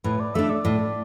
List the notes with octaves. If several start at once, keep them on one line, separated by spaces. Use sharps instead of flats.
A2 B4
D5
A3 D4 E5
D5
A2